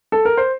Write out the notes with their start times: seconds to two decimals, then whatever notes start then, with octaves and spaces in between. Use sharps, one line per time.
0.12 A4
0.25 A#4
0.37 C5